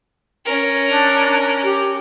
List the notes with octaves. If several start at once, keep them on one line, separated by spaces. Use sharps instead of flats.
C#4 A#4
D4
G4